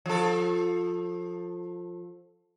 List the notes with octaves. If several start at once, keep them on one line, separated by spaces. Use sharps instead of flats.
F3 A4